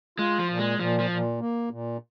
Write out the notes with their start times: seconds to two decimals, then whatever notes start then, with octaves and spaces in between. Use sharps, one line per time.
0.18 G#3 F4
0.39 F3
0.50 A#2
0.59 G#3
0.79 A#2 F3
0.99 F3
1.10 A#2
1.40 A#3
1.70 A#2